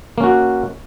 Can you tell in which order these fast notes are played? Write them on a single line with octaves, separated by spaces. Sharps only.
A#3 C#4 F#4